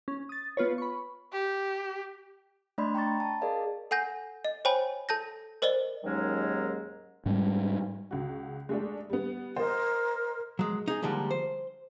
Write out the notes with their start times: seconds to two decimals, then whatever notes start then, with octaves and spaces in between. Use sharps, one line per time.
0.08 C#4
0.29 D#6 A6
0.57 B3 F4 B4 C#5
0.78 B5 C#6
1.32 G4
2.78 A3 D4 D5 D#5 B5 C6
2.94 G5 A#5 B5 C#6 A6
3.20 A5
3.41 G#4 A#4 D5 D#5 F5
3.91 A4 F#5 G#5 G6 A#6
4.45 D#5
4.65 C5 C#5 G5 G#5 B5
5.09 A4 A5 G6 A#6
5.62 A#4 C5 D5 D#5 G7
6.04 D#2 G#2 D#3 F#3 G#3 C#4
7.26 G#2 G3 G#3 C#4
8.11 C#2 F#4
8.69 G#3 A3 D4
9.10 G3 B3
9.56 A#4 C5 D#5
10.59 F#3 G#3
10.88 D#4 G#4
11.02 D3 F3 G3 G#3 A#3
11.31 C5